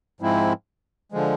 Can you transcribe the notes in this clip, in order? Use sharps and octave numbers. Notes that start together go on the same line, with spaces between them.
G#2 F3 G#3 C4 E4
D3 F3 G#3